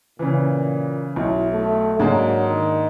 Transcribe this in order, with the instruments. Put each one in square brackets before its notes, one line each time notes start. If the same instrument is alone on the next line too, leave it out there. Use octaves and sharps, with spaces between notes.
[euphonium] A#2 [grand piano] C#3 E3
[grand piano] B1 [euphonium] E4
[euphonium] A3
[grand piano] G#2 A#3 [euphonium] F#3 [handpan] D4 G#4
[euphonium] D#3